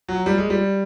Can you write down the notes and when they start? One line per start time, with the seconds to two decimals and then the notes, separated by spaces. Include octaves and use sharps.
0.09 F#3
0.26 G3
0.38 G#3
0.50 G3